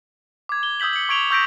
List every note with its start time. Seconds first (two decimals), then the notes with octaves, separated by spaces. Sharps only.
0.49 D6 G#6
0.63 G7
0.80 D#6 E6 G6 B6 F#7
0.93 C#7 F#7
1.09 C#6 G#6 D7 F7 G7
1.31 C#6 E6 G6 A#6 B6 D7